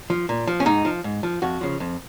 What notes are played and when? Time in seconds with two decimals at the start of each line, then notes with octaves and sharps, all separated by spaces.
0.10 F3
0.29 A#2
0.47 F3
0.60 C#4
0.66 G#2 D#4
0.85 F3
1.04 G#2
1.23 F3
1.42 F2 F#4
1.61 C#3 F3
1.80 F2